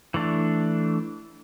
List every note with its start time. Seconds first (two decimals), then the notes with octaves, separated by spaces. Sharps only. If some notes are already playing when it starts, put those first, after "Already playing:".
0.14 E3 A3 D4